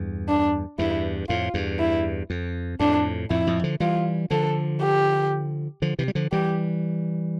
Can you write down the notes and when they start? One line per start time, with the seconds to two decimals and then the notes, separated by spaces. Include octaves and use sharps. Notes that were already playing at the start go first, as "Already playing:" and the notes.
Already playing: E2 G2
0.28 D4
0.78 E2 G2 E4
1.29 F2 A2 F4
1.54 E2 G2
1.79 E4
2.30 F2
2.80 F2 A2 D4
3.30 F2 A2 E4
3.47 F2 A2
3.64 D3 F3
3.80 E3 G3 F4
4.31 D3 F3 A4
4.81 G4
5.82 D3 F3
5.99 C3 E3
6.08 G3
6.15 D3 F3
6.32 E3 G3 G4